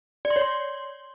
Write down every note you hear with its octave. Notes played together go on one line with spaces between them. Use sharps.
D5
C6
C#5
C6